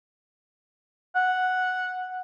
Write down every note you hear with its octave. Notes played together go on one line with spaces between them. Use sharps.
F#5